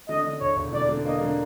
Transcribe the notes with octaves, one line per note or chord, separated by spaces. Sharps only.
D3 D#5
D3
E1 C#5
E1
D3 D5
D3
A#3 D#5
D3